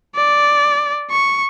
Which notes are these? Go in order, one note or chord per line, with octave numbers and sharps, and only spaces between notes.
D5
C#6